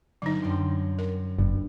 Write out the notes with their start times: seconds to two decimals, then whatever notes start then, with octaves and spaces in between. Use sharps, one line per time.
0.22 G1 F#3 D#4
0.42 F#2 G5 C6
0.99 A#4
1.39 F#1 G2